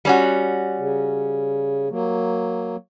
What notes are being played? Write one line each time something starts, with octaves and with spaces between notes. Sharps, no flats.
G3 C#4 F#4
C#3
F#3 A#3